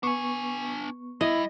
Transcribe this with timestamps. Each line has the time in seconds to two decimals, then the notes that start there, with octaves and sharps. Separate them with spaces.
0.03 B3 D4 G#5 C#6
1.21 G3 E4 D#5